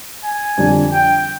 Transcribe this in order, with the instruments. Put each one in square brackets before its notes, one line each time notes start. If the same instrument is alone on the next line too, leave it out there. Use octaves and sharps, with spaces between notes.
[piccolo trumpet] G#5
[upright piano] F2 D3 G3 D4
[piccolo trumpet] G5